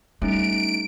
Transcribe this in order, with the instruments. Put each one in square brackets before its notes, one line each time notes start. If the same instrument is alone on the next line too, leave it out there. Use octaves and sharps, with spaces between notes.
[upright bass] G3 [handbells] A3 C#4 D#4 [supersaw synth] D7